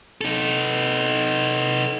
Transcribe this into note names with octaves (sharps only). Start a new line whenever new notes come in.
D#4 A4